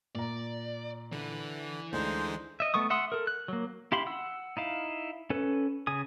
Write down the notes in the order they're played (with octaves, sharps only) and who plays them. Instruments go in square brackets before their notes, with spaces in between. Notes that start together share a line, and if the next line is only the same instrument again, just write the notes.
[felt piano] A#2 A#5 [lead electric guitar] D5
[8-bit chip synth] D3 [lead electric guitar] E3 B4
[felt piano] D2 [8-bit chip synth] D3 G#3 D#4 [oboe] C5
[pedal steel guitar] D#5 E5
A3 B3 C#6 D#6
E5 F#5 C6 D#6
A4 A#4
F#6
F#3 A#3
E4 G4 F5 B5 C6
F#5 E6
D#4 E4 F5
C#4 A4 B4
C#3 G#5 D#6